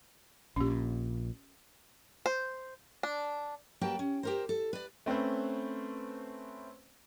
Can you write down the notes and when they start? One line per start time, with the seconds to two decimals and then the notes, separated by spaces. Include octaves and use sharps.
0.56 A#1 A#2 C#4 G4
2.26 C5
3.03 D4
3.81 F#3 A#3 G4 B4 G5 A5
3.99 C#4
4.23 G4 A#4 C5
4.49 A4
4.73 B4 D5
5.06 A3 C4 C#4 B4 C5